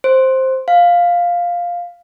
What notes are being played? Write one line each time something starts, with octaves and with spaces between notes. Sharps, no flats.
C5
F5